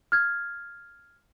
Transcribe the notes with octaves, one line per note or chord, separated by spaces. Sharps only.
F6 G#6